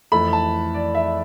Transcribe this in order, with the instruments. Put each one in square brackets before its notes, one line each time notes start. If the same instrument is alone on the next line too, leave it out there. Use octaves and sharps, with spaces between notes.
[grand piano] F2 E3 A3 E4 A4 [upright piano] B5
[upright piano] A5
D5
E5